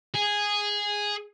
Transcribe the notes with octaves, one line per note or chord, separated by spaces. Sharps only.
G#4